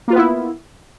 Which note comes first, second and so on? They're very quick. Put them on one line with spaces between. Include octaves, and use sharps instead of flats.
A#3 F4 B4 B3 E4